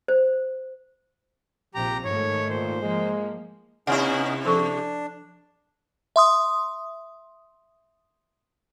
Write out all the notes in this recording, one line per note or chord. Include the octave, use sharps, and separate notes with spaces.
C5
A#1 C3 F3 G4 A#5
G#2 D#3 A3 C#5
A#2 C5
F3 G#3 A#3
C3 B3 C#4 D#4 E4 F#5
F3 D4 A4 C#6
E5 C6 D#6